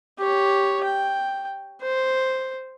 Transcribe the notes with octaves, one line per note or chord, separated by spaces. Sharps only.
G4 C#5
G5
C5